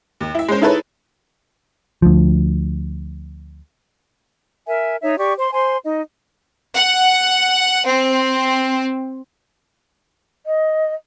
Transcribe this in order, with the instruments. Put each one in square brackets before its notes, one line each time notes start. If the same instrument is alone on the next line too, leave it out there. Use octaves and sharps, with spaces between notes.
[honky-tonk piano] D#2
E4 E5
G#3 C#4 C5
D#4 E4 G#4 A4 B4 C#5
[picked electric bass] D2 F3
[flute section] A#4 E5 G#5
D#4 C#5 E5
G4 D5 C#6
C5 C6
C5 G#5 C6
D#4 D#5
[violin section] F#5
C4
[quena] D#5